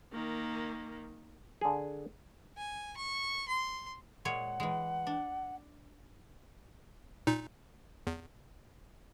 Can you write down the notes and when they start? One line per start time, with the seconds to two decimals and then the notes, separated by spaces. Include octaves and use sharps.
0.13 D#3 A#3
1.61 D3 G#4
2.57 G#5
2.97 C#6
3.48 C6
4.25 A#2 G#3 C#5 F#5
4.60 E3 G#3
5.07 D4
7.27 A#2 D#4
8.07 E2